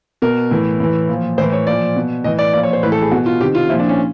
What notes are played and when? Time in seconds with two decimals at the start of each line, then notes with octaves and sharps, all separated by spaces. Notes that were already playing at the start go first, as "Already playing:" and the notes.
0.22 B2 A#4
0.51 A2 E3
0.80 A2 E3
1.09 A#2 F3
1.38 A2 C5
1.41 E3
1.53 C#5
1.67 A#2 F3 D5
1.96 B2
2.24 A2 E3 D#5
2.39 D5
2.53 A#2 D5
2.57 F3
2.63 C#5
2.73 C5
2.83 A2 E3 B4
2.92 A4
3.02 G#4
3.11 B2 F#4
3.26 F4
3.41 C3 D#3 G4
3.55 F4
3.69 A#2 F3 E4
3.79 D4
3.89 C#4